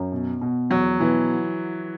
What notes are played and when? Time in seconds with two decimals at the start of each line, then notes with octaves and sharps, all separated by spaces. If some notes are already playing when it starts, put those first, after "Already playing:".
Already playing: F#2
0.12 B2
0.41 B2
0.70 E2 F#3
0.99 B2 E3